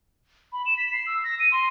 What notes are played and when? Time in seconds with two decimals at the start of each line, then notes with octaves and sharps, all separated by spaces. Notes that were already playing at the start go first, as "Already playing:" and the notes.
0.53 B5
0.66 E7
0.77 B6
0.92 C7
1.07 E6
1.24 A#6
1.40 D#7
1.52 C6